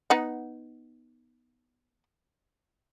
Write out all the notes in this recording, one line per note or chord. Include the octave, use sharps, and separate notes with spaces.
B3 D#4 F#5